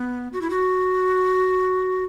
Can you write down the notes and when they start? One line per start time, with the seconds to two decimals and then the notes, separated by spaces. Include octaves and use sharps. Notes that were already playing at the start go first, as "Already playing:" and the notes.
Already playing: B3
0.33 F#4
0.41 E4
0.50 F#4